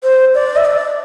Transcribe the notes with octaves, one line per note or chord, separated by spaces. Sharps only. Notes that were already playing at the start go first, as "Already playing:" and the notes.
C5
D5
E5
D5